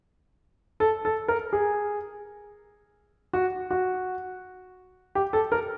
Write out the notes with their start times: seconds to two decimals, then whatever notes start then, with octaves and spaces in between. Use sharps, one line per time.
0.80 A4
1.05 A4
1.28 A#4
1.53 G#4
3.33 F#4
3.71 F#4
5.15 G4
5.33 A4
5.52 A#4